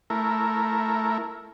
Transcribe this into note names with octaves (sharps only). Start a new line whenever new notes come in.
A3 E4 A#4